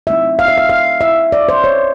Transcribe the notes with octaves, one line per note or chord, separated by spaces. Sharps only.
F#3 A3 C4 D#4 E5
F5
E5
F5
F5
E5
D5
C5
C#5